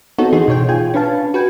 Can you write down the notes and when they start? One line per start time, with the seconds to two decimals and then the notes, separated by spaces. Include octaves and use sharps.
0.18 B3 C4 D#4 F#4 A4 C#5
0.33 E3 D#4 G#4 C6
0.48 B2 C#5 G5
0.68 F4 G#4 G5 G#5
0.94 C#4 D4 B4 F5 A5
1.34 F#4 B4 G5 G#5